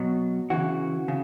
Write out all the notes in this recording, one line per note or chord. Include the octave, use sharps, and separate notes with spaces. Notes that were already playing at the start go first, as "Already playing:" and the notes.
Already playing: B2 F#3 F#4
C#3 E3 F#4
C#3